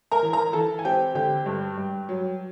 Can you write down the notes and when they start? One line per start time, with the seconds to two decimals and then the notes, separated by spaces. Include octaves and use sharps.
0.12 A#4 A#5
0.23 E3
0.33 A#4 A#5
0.53 E3 A4 A5
0.79 G#5
0.84 C4 G4 G5
1.15 D3 G4 G5
1.46 G2
1.77 G2
2.09 F#3